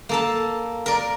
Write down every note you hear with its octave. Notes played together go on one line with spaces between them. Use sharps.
A#3 A4 A5
A#4 D5